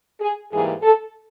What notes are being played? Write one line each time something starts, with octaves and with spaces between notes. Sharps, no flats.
G#4
G#2 E3 G3 A#3 G#4
A4